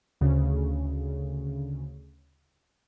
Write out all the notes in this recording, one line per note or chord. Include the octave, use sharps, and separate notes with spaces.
D2 C#3